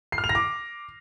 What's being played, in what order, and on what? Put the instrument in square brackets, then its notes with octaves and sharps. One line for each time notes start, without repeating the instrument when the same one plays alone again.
[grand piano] C7
F6
F7
A#6
D6